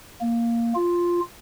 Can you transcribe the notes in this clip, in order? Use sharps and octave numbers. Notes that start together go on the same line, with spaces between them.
A#3
F4